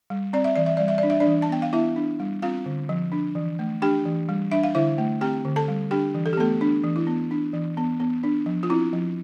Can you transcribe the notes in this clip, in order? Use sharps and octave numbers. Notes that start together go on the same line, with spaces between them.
G3
C4 D5
E5
E3 D5
E5
G3 D5
E5
D5
D4
E5
D4 D5
E3
A5
B3 G5
F5
B3 E4 E5
D4
G3
C4 F4 F5
D3
F3
D4
E3
A3
D4 G4 G5
E3
G3
D4 E5
F5
D3 E4 E5
A3
C4 G4 G5
D3
A4 A5
G3
D4 G4 G5
E3
A4
G4
A3 B3 A4
D4
E3
E4
B3
D4
E3
B3
B3
D4
F3
F4
C4 E4
F3